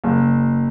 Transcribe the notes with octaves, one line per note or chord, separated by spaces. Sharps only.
F#1